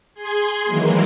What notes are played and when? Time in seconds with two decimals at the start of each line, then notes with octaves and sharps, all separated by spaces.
0.14 G#4 C6 G#6
0.64 D#3 E3 F#3 G#3 A#3